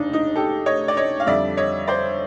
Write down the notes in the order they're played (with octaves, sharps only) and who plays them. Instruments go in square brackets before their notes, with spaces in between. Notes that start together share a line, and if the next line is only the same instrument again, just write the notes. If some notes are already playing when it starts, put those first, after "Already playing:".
Already playing: [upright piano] F1 D#2 C#3 D4 D#4
D#4
G4 A4
C#5 D#5
D5
C#5 D#5
F5
F2 D3 G3 D5 E5
C#5 D#5
C5 D5